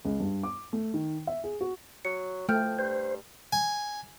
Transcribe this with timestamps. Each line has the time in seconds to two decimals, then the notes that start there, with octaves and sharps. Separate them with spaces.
0.05 C#2
0.20 G2
0.43 D6
0.73 A3
0.94 D#3
1.27 E5
1.44 G#4
1.61 F#4
2.05 F#3 C#7
2.49 F3 A3 G5 F6 G6
2.79 G2 C5
3.53 G#5